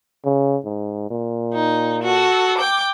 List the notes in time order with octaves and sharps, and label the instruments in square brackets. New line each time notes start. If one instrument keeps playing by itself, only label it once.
[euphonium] C#3
G#2
A#2
[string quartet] D#4
F#4 A4
G5 D6